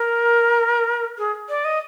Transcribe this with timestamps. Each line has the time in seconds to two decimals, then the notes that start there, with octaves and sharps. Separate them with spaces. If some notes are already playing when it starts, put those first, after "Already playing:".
Already playing: A#4
1.18 G#4
1.49 D5
1.65 D#5